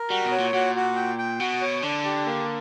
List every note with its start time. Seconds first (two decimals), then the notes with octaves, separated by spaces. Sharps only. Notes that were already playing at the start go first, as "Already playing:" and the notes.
Already playing: A#4
0.10 G3 F#4
0.25 B2
0.32 C#5
0.39 A#2
0.53 A#2 F#4
0.75 F#4
0.96 G5
1.18 G5
1.40 B2 F#4
1.61 C#5
1.82 D3 D4
2.05 G4
2.26 A#3